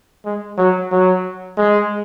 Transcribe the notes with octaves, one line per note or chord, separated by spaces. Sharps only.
G#3
F#3
F#3
G#3